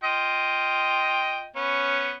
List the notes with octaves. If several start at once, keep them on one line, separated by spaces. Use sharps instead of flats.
F4 D#5 G5
B3 C#4